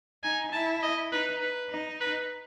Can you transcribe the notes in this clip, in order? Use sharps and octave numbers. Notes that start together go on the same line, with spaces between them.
D#4 G#5
E4 A5
D#5
D#4 B4
B4
D#4
B4